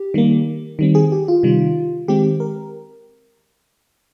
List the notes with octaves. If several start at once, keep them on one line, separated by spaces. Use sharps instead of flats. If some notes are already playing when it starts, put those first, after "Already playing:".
Already playing: G4
D#3 G3 A#3
D#3 G3 C4
G#4
G4
F4
C3 D#3 G3
D#3 G#3 C4 G4
A#4